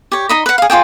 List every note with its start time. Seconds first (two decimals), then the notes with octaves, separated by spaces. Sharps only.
0.12 G4 C#5
0.29 D#4 D#5 B5
0.46 B4 F#5
0.58 G#4 F5
0.70 F4 F#4 G#4 G5